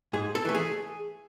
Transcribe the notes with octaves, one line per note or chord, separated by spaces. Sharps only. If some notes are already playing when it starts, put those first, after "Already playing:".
G#2 G#4
A4
E3 A3
G#4